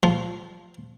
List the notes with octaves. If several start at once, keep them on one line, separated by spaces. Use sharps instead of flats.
F3